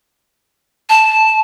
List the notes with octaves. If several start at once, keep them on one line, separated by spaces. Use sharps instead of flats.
A5